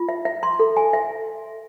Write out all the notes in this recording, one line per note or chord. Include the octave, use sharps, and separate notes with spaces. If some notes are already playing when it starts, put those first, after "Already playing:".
Already playing: F4
E5
E5
C6
A4
G#5
E5